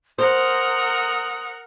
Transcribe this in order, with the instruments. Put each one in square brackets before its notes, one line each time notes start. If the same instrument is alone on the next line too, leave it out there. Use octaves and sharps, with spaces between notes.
[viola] A#4 F#5 [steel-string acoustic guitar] C5 [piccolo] D#6